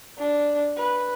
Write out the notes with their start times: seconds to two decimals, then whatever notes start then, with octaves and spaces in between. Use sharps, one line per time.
0.18 D4
0.78 B4